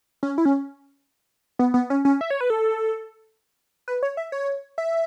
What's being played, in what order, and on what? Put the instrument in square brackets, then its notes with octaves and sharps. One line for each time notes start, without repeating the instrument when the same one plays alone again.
[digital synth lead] C#4
E4
C#4
B3
B3
C#4
C#4
E5
C#5
B4
A4
B4
C#5
E5
C#5
E5